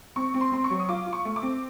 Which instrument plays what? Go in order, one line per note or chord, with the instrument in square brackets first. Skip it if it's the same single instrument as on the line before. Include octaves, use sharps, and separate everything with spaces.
[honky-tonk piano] C4 C#6
C4
C6
C4 C6
C#6
F#3
D#6
F4 D6
F4
C#6
A3
D6
C4